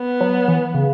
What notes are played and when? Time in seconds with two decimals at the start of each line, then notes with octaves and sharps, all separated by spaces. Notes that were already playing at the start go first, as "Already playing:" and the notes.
Already playing: B3
0.21 F#3
0.48 E3
0.74 C#3